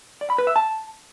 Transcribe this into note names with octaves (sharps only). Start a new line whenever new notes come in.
D5
B5
B4
E5
A5